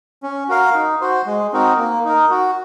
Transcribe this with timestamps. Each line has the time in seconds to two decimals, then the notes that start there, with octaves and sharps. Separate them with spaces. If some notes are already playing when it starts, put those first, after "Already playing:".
0.23 C#4
0.49 F#4 A#4 F5
0.74 D#4
1.01 F#4 C5
1.26 G#3
1.53 C4 D#4 F#4 A#4
1.78 A#3
2.05 D#4 A#4
2.30 F#4